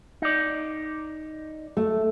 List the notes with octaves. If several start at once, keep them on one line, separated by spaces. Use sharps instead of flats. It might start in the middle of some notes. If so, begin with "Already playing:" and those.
D#4 D5
A3